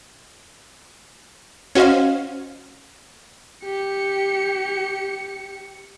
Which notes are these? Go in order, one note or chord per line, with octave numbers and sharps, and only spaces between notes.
C#4 F#4 C5 D#5 F5
G4 C#7